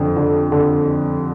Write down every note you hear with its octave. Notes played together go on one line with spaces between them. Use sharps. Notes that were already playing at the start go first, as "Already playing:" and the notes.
Already playing: F2 D3
D3
D3